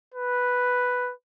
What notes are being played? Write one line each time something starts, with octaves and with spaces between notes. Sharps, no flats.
B4